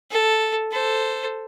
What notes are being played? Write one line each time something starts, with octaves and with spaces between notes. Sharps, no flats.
A4
A4 C5